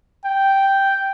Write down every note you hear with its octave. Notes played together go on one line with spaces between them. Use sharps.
G5